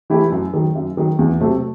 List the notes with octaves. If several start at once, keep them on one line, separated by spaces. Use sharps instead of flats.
E3 A3 E4 G4
F#2
D#3 F#3
F#2
D#3 F#3
E2
C3 F#3 A3